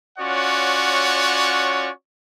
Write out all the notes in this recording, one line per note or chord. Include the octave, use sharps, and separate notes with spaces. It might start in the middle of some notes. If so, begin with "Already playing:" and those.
C#4 F4 F#4 C#5 D5 F#5